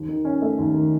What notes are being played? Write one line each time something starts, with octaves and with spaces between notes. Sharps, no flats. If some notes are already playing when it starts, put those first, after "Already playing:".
Already playing: D#2
D#3
C#4
A3
D#2
D#3